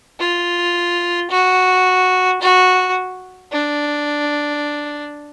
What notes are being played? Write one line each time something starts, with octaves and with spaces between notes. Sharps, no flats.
F4
F#4
F#4
D4